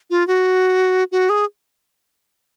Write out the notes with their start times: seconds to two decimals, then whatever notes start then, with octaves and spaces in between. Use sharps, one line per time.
0.10 F4
0.28 F#4
1.12 F#4
1.30 G#4